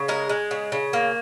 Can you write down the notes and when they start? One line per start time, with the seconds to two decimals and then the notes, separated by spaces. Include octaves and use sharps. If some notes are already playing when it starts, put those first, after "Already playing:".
Already playing: C#3
0.08 G#3 A#4
0.29 G#3
0.51 C#3
0.72 C#3
0.93 A#3